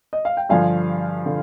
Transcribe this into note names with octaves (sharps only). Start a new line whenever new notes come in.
D#5
F5
G5
G2 D3 F3 F5 G#5
D3